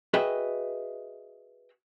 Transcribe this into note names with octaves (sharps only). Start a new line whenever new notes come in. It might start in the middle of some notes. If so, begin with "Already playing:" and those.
F#4 G#4 B4 D#5 E5 G5